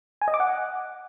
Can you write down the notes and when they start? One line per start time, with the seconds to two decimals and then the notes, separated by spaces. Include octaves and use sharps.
0.22 G#5
0.28 D#5
0.34 D6
0.40 F#5